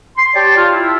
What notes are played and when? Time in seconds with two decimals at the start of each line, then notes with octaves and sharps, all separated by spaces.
0.17 C6
0.34 G4 C#5 D5 G5 A5
0.57 F4
0.73 E4